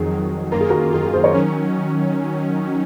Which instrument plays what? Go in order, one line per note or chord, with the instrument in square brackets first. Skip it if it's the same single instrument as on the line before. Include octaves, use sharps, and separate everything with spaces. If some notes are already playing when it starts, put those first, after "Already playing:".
Already playing: [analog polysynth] F2 D#3 F#3 [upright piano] G#4
[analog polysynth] F2 D#3 F#3
[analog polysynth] F#2 D#3 A#3 F4 [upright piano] A#4
[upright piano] G#4
F#4 A#4
[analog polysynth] F#2 D#3 A#3 F4 [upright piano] G#4
[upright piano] G#4
G#4 C5
A#4 C#5
[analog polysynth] D#3 F#3 C#4